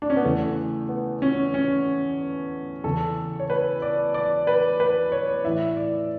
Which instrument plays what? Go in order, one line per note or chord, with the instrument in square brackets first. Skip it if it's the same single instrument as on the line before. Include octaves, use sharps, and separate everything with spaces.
[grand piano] D4
C#4
B3
E2 C#3 E3 A3
B3
C#4
C#4
E2 C#3 E3 A4
C#5
B4
D5
D5
B4
B4
C#5
A2 E3 E5
D5